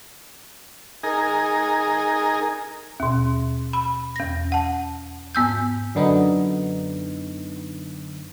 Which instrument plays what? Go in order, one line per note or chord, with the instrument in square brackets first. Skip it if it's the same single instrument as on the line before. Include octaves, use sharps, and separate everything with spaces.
[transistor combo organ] D#4 G#4 A#4
[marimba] D#2 B2
B5
E2 A#6
F#5 A5
G#2 B3 E6 G6
[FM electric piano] F#2 D3 B3 D#4